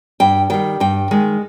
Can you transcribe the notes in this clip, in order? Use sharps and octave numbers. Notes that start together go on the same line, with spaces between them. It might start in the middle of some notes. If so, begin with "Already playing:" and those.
G2 G5
D#3 G3 G5
G2 G5
D#3 G#3